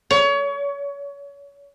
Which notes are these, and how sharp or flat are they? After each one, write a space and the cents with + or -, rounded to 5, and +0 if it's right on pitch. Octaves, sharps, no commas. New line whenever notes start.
C#5 +30